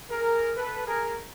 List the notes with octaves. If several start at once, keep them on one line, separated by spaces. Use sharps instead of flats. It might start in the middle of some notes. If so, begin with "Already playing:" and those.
G#4 A#4
A4 B4
G#4 A#4